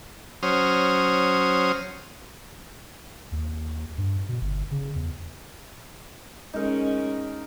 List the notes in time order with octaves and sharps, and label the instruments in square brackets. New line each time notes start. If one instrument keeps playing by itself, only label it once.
[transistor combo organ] F#3 C#4 C5 D#6 F6
[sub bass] D#2
G2
B2
G1
C#3
E2
[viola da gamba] G#3 C#4 [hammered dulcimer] D#4 A#4